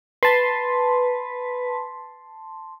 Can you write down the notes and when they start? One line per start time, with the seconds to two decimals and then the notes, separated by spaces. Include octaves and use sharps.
0.23 B4 A5 C6